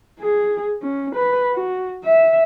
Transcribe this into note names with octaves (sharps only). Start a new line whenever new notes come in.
G#4
C#4
B4
F#4
E5